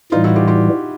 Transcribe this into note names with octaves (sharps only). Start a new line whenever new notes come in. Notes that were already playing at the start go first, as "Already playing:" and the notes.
A2 E3 G3 D#4 F4
E4 F#4
F4 G4
F4 G4